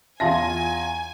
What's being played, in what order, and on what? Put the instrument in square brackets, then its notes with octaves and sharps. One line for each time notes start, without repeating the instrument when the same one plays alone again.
[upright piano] E2 F4 A#6 [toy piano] E5 A5 C6 [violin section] G#5